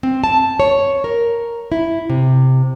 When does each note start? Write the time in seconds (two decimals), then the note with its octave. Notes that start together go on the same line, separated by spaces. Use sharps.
0.03 C4
0.24 A5
0.60 C#5
1.04 A#4
1.72 E4
2.10 C3